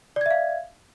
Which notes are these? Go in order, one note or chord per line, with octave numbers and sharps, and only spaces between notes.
D5 E5 F5 G#6